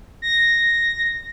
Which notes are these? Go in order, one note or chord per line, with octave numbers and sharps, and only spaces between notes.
A#6